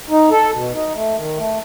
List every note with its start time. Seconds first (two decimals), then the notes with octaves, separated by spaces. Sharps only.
0.09 D#4
0.31 A4
0.52 B2
0.73 D#4
0.94 A3
1.16 D#3
1.36 A3